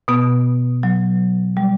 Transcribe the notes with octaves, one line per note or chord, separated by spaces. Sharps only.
B2 B3
F#3
G3